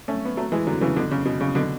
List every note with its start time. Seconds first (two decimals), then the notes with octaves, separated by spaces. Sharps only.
0.08 A3 C#4
0.25 B3
0.37 F#3 A3
0.52 E3 G#3
0.67 D3 F#3
0.81 C#3 E3
0.96 B2 D3
1.11 C#3
1.25 B2
1.41 C#3
1.55 B2 D3